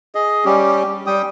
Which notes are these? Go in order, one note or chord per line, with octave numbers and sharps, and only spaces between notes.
G#4 D#5
G3 C#4 G4
G3 G5 D#6